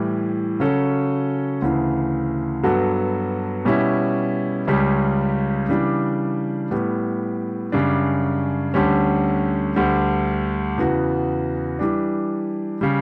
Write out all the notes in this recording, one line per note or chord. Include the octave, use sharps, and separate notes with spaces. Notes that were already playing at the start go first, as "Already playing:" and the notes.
Already playing: A2 E3 G3
C#3 F#3 C#4 F#4 A4
D2 C#3 E3
G2 F#3 B3 F#4 A4
B2 G3 C#4 E4
C#2 C#3 G3 C#4
C#3 E3 G3 D4
A2 G3 B3
F#2 C#3 G3 D4
D2 D3 G3 C#4
D2 D3 G3
E2 C#3 E3 B3 F#4
E3 G3 D4
C#3 G3